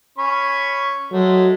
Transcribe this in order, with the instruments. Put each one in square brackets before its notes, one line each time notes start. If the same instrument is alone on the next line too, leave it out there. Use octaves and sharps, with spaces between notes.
[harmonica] C#4 B5 C#6
[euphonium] F#3 [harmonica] G#3 A3